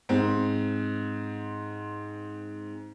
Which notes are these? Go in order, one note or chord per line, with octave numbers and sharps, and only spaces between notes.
G#2 C4